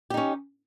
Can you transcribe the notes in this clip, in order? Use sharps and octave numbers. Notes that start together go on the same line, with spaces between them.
C#4 D#4 G4